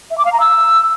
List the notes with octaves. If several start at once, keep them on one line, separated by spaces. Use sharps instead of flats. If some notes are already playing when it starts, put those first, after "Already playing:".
E5
D6
F5
A#5
E6